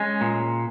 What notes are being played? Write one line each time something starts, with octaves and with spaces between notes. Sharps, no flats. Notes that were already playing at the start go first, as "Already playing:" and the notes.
Already playing: G#3 C#4
A#2